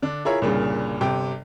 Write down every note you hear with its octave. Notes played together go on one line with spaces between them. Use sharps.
D3 D4
E4 F4 G#4 A#4 C#5 E5
C2 G2 A#2 C#3
G1 C3 G5